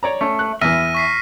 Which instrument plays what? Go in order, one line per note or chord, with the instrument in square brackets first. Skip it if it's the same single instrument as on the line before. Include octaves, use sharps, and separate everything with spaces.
[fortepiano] C#5 D5 A#5
[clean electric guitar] A3 [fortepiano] C#4
[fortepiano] F#6
[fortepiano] E2 E3 [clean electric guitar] E5 [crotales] F6 A#6 D#7
[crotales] C#6 B6 C7